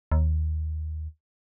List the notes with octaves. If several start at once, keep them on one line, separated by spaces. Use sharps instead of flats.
D#2